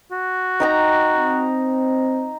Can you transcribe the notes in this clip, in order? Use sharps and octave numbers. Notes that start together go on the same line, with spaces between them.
F#4
D#4 G5 A#5
C4